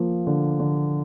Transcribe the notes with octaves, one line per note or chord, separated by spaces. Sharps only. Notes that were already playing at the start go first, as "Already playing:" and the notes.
Already playing: F3 A#3
D3
D3